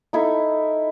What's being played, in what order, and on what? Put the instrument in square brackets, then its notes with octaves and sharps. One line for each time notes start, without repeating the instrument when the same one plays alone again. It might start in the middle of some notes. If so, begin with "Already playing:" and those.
[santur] D#4 E4 A4